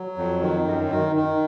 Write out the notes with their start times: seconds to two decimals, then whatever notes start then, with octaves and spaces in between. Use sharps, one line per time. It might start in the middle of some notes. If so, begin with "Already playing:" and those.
Already playing: F#3
0.18 F2
0.41 D#3
0.67 F#2
0.90 D#3
1.16 D#3